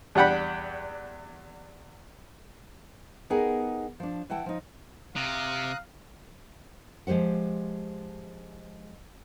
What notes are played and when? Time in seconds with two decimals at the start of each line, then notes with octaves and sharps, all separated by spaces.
0.15 E2 G3 D4 F#5 G5 B5
3.30 B3 D#4 G4 G#4 A#4 F#5
4.00 F3 D4
4.30 E3 E4 F#5 G5 A5
4.46 F3 D#4
5.16 C3 F5 A#5 D#6 F#6
7.07 F3 G#3 G4 C5 F#5